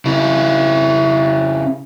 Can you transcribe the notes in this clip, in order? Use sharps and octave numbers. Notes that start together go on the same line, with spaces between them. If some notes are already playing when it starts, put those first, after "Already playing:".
C#3 E4